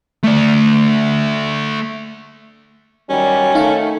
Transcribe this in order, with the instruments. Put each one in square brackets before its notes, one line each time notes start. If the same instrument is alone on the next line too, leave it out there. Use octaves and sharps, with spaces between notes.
[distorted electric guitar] A3 D5
[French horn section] D#3 F#3 G3 [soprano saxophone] C#4
[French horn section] D#3 A3 [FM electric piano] D#4 F5